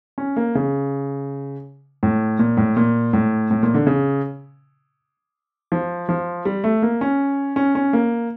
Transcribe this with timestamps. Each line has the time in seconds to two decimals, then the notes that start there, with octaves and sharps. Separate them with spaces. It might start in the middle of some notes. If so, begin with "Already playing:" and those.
0.18 C#4
0.37 A#3
0.55 C#3
2.03 A2
2.39 A#2
2.57 A2
2.77 A#2
3.13 A2
3.51 A2
3.63 A#2
3.74 D3
3.87 C#3
5.72 F3
6.09 F3
6.45 G3
6.64 A3
6.82 A#3
7.01 C#4
7.56 C#4
7.75 C#4
7.93 A#3